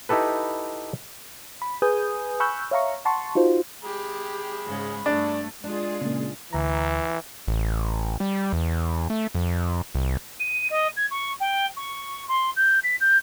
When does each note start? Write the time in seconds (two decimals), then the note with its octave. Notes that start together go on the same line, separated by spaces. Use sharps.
0.09 D#4 E4 G4 A4 B4
1.62 B5
1.82 G#4 B4 G#5 D#6 G6
2.40 G#5 B5 C#6 E6 F#6 G6
2.71 C#5 E5 F5 A#5 C#6
3.05 F#5 A5 C6 C#6
3.35 D#4 F4 F#4 C5
3.84 G#3 G4 G#4 B5
4.66 G#2 C#3
5.06 G2 A3 D4
5.64 G#3 D4 F4 G#4
6.01 A#2 C#3
6.53 D2 E3 A#5
7.48 A1
8.20 G3
8.53 E2
9.10 A3
9.35 F2
9.95 C2
10.40 D#7
10.70 D#5
10.97 G#6
11.11 C#6
11.40 G5
11.77 C#6
12.28 C6
12.56 G6
12.84 B6
13.00 G6